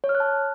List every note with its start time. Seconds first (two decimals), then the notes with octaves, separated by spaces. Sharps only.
0.04 C#5
0.09 F6
0.15 F#6
0.20 A5